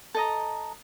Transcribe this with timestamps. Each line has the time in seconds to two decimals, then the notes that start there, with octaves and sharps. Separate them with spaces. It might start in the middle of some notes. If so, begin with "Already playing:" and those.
0.14 A4 D#5 A#5